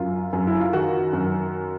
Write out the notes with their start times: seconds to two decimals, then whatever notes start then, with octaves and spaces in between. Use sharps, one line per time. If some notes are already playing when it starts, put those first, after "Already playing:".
Already playing: F#2 F4
0.33 F#2
0.47 E4
0.60 F4
0.73 D#3 F#4
1.13 F#2